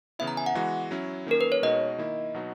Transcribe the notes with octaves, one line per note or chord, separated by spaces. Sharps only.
C#3 E3 B3 E4 E5
A#5
G#5
F#5
E3 G#3 B3 F#4
F#3 C#4 E4
D#3 A#3 C#4 A#4
B4
C#5
B2 G#3 D#4 F#4 D#5
D#3 A#3 E4
B2 F#3 B3 D#4 F#4